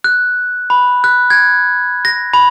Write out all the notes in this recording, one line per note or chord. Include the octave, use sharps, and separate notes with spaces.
F#6
B5
F#6
G#6
A#6
B5